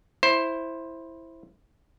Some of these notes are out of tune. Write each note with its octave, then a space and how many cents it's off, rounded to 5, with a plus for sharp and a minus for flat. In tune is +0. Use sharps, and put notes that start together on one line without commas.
E4 +0 C5 +10